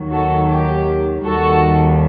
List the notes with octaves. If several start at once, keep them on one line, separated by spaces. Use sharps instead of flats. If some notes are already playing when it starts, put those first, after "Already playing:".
Already playing: D#2 D#3 F#3
F#4 A4
G4
D#2 D#3 G3 F#4 A4